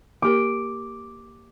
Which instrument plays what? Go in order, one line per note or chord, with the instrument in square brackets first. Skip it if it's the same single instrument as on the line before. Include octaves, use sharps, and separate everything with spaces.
[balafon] A#3 G4 A#4 [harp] D6